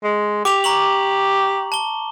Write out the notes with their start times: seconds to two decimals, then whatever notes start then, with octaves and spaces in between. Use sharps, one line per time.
0.03 G#3
0.45 G4 D6 F7
0.64 A#5 C#6 F#7
1.72 A5 G7